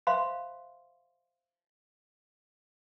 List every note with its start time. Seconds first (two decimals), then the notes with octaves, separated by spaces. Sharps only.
0.07 C5 E5 F5 B5 C6